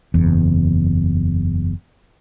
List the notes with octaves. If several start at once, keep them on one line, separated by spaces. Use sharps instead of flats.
F#1 E2